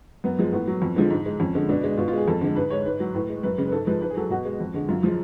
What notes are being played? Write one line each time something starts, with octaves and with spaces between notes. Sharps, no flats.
F#2 B3
F3 G#3
A2 B3
F#3
F2
D3 F3 G#3
G#2
G#3
F2 C#4
D3 G#3
B2 D4
G#3
B2 F4
F4
G#3 G#4
F2 A4
D3 G#3
G#2 B4
G#3 C#5
G#2 B4
F#3
A2 B4
G#3
F#2 B4
C#3 G#3
B4
G#2 A4
F3 G#3 B4
G#2 B4
G#4
F#3 A4
B2 F#4
G#3
F2
D3 G#3
F#2 F4
F3 G#3